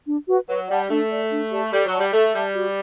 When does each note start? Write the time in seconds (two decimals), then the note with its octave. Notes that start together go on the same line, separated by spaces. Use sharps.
0.06 D4
0.27 F#4 B4
0.48 F#3 B4
0.68 G3 D5 F#5 A5
0.89 A3 D4
1.09 A4 D5
1.31 D4
1.51 G4 D5 A5
1.72 G3 A4
1.85 F#3
1.92 D5 F#5 A5
1.99 G3
2.12 A3 A4
2.34 G3 E5 A5
2.55 F#4